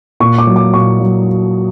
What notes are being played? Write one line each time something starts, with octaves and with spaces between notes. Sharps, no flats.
A#2 C#6
D6
F#3
D6
A#2 C#6
F#3